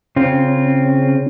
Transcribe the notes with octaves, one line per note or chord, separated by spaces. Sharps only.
C#3 C4 C#4 F4